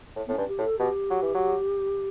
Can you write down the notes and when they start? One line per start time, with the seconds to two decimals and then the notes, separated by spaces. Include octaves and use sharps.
0.16 A2
0.26 B3
0.29 A2 C#4
0.38 G2
0.48 G4
0.58 A2
0.64 A4
0.78 B2 G4
1.10 F#3
1.22 E3
1.34 F#3